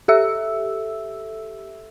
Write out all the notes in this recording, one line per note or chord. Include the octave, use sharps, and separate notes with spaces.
G4 A4 E5 E6